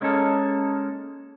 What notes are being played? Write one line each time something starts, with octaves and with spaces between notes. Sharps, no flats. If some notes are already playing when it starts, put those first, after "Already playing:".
G#3 A#3 C#4 D#4 E4 A4